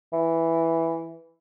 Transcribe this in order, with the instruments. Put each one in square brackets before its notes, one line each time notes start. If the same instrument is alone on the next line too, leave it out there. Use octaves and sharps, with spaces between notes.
[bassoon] E3